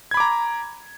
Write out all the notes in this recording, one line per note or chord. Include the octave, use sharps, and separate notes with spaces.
A#5 B5 D6 G#6